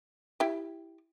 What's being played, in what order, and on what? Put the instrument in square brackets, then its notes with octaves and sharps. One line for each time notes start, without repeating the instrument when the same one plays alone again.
[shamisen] E4 G4